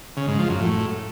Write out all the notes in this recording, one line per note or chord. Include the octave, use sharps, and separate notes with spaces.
C#3
G#2
F3
F#2
A2